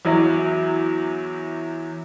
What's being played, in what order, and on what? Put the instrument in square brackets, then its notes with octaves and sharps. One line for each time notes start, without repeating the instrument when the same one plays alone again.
[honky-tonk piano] E2 F#3 E4